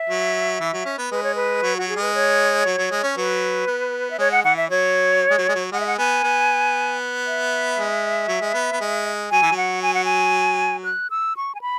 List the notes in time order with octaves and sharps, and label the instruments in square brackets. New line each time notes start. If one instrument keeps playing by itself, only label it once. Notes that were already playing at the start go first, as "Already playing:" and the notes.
Already playing: [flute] E5
[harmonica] F#3
E3
F#3
C#4
B3
[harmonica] G#3 [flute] B4
[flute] C#5
B4
[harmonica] F#3
[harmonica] F#3 [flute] F#4
[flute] G#4
[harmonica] G#3
[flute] B4
C#5
[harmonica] F#3
F#3
G#3
C#4
[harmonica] F#3 [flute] B4
[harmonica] B3
[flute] E5
[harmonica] G#3 [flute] C#5
[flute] F#5
[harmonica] E3 [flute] F#5
[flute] E5
[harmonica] F#3 [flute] C#5
[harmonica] G#3
F#3
G#3
F#3
[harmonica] G#3 [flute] F#5
[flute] E5
F#5
[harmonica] B3 [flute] G#5
[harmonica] B3
[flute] E5
[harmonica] G#3
F#3
G#3
B3
B3
G#3
[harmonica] F#3 [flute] G#5
[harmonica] E3
F#3
[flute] F#5
G#5
F#5
G#5
F#6
E6
C#6
G#5
B5